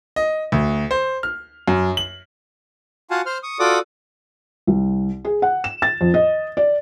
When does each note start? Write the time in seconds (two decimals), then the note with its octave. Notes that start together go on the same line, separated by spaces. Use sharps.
0.16 D#5
0.52 D2
0.91 C5
1.23 F6
1.68 F#2
1.97 F#7
3.11 F4 F#4 F5 F#5 G#5 A5
3.26 C5 C6 F6
3.43 C#6 D#6
3.59 F4 F#4 A4 D5 D6 D#6
4.67 C2
5.25 G#4
5.42 F#5
5.64 E7
5.82 A6
6.01 F2
6.14 D#5
6.57 D5